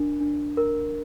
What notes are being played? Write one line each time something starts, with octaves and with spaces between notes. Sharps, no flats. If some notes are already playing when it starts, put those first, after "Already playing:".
Already playing: D4 A#4
D4
A#4